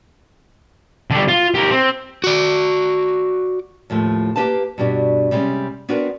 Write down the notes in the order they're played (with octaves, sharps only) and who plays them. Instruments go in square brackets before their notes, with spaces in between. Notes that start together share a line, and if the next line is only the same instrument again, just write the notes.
[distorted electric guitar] D3 G3
F4
G4 A#4
C4
[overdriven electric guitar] F#4 D5
[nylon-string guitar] D#2 A2 F3 A3
A#3 G4 B4 F5 A5
G2 B2 G3 D4 F#4
C3 G3 G#3 C4 C#4
B3 C4 D4 F#4 A#4 B4